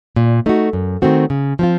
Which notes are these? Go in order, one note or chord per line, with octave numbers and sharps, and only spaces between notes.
A#2
A3 D#4 F#4
F#2
D#3 A3 C4 F#4
C#3
F3 C4 F4